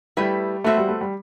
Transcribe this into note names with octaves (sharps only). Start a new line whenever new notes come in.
G3 A3 E4 G4 B4
A3 B3 F#4 C5 E5
G3
A3
G3